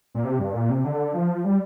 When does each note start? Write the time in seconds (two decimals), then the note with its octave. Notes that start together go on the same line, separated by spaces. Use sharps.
0.15 A#2
0.24 C3
0.39 G2
0.53 A#2
0.69 C3
0.84 D3
1.13 F3
1.44 G3